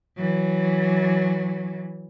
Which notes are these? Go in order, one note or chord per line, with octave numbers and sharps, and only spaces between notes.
E3 F#3